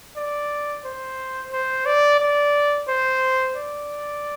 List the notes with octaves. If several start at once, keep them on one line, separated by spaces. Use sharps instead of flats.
D5
C5
C5
D5
D5
C5
D5